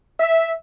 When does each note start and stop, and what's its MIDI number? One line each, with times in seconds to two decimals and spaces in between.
0.20 0.52 76